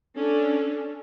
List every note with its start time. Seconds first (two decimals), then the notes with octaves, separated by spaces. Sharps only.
0.16 C#4 D4 A4